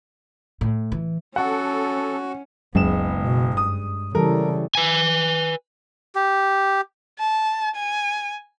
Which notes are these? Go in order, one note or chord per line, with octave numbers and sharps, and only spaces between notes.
A2
E3
C#4 F#4 A4 F#5
F#1 C#2 F#2 G#3 B3 E7
B2
G2 D#6
C#3 E3 G3 A4 A#4
B4 G#5
G4
A5
G#5